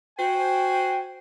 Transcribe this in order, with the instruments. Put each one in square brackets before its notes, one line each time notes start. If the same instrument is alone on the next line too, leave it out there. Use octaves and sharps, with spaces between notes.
[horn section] F#4 C5 G#5 [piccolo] G5